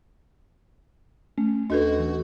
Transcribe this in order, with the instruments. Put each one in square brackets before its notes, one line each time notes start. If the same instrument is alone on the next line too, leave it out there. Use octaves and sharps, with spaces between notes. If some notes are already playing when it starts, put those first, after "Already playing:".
[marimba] A3 [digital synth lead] C#4
[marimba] D#2 D#5 [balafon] D4 A4 B4 [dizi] F#4
[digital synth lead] E3